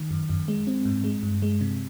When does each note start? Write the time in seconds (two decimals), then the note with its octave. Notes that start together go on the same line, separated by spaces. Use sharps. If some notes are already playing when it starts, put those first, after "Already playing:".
Already playing: D#3
0.11 F#2
0.30 F#2
0.48 G#3
0.67 C4
0.85 G#2
1.04 G#3
1.23 G2
1.42 G#3
1.61 C3